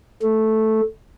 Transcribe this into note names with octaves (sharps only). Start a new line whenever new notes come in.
A3